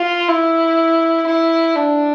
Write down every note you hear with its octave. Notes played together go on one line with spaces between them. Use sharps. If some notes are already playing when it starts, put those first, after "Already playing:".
Already playing: F4
E4
E4
D4